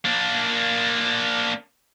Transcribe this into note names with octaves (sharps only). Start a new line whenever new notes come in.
A#3 D4